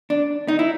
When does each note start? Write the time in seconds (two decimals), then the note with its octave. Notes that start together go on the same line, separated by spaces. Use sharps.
0.10 D4
0.48 D#4
0.59 E4